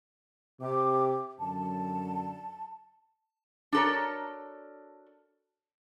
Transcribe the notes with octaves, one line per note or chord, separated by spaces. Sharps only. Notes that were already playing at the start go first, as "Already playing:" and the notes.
C3 D6
F#2 D3 F#3 A5
D4 F#4 A4 A#4 C#5